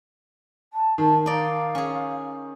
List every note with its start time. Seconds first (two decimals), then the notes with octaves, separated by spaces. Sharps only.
0.73 A5
0.98 D#3 A5
1.26 D#4 D5 F5
1.75 C#4 G#4